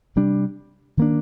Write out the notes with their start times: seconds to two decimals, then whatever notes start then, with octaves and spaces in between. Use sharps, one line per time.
0.16 C3 G3 D4
0.97 D#3 A#3 D4